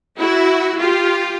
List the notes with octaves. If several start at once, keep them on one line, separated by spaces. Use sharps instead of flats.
E4 F#4
F4 G4